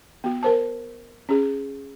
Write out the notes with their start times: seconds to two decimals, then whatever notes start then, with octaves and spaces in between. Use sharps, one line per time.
0.24 B3 F#4
0.43 A#4 C5 A5
1.29 C#4 G#4